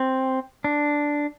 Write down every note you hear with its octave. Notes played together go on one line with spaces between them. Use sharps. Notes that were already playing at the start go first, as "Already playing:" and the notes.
Already playing: C4
D4